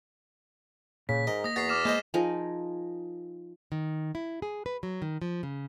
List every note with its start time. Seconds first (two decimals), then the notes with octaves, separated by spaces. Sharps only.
1.09 A#2 C#3 B6
1.27 G#2 A#4 D#5
1.44 A#3 D#6 A#6
1.56 E2 F#4 A6 C7
1.69 D6 F6 E7
1.85 G#3 A#3 C5 D#5
2.14 F3 D#4 G#4 A#4
3.72 D#3
4.15 E4
4.42 G#4
4.66 B4
4.83 F#3
5.02 D#3
5.22 F3
5.43 C#3